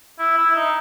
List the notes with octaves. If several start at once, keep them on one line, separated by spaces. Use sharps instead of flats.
E4
E4
D#4